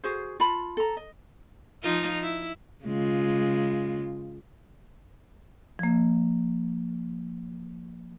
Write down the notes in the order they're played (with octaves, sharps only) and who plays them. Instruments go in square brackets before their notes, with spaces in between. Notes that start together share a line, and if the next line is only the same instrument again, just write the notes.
[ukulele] F#4 G#4 C5
F4 A5 B5
A4 A#5
D#5
[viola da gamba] F3 D#4 F4
E4
C#3 G#3 F4
[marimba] F3 A#3